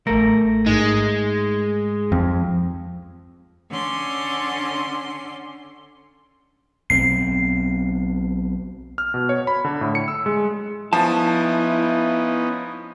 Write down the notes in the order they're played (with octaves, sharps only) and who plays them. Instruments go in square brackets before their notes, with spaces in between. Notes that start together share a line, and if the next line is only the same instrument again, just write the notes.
[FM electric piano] A1 A#6 [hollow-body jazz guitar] A3 A#4
[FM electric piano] G#2 D#4 [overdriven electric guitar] G#3
[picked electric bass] F2
[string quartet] D3 C#4 C6
[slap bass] B1 F3 C4 [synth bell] C7
[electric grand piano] F6
B2
C#5
B5
D3
A2
C#7
E6
G#3
[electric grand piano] F3 [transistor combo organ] B3 C#4 D#4 [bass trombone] E4 [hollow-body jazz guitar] A5